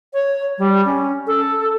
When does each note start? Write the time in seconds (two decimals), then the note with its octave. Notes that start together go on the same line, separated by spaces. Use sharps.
0.13 C#5
0.58 G3
0.85 C#4
1.27 A4